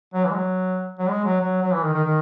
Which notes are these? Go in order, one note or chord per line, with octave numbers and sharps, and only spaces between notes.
F#3
E3
G#3
F#3
F#3
G#3
F#3
F#3
F#3
E3
D#3
D#3
D#3